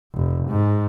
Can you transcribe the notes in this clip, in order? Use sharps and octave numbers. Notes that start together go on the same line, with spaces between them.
F1
G#2